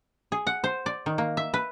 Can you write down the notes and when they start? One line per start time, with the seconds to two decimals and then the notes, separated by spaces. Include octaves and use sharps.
0.32 G#4
0.47 F#5
0.64 C5
0.86 D5
1.06 D#3
1.18 A#3
1.37 E5
1.54 B4